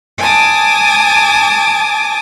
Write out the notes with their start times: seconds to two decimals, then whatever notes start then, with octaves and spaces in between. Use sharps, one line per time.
0.18 G#5 A5 D6 D#6